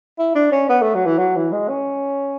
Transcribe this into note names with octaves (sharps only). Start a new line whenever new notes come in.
E4
D4
C#4
B3
A3
F#3
E3
F#3
E3
G#3
C#4